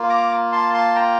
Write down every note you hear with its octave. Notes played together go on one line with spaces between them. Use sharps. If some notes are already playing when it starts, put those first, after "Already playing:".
Already playing: A#3 F4
A#5 D6
A5 C6
A5 C6
G5 A#5